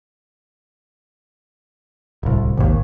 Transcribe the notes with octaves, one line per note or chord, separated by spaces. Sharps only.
D1 C2
G#1 D#2